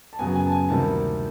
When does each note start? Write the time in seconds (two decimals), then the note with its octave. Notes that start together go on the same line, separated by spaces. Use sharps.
0.13 A5
0.19 F#2 C#3 F#3 B3 G#5
0.36 G#5
0.47 A5
0.52 G#5
0.69 D2 C3 D#3 G3 A#3 A5